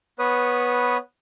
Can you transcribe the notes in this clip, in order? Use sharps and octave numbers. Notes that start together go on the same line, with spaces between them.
B3 B4 C#5 D#6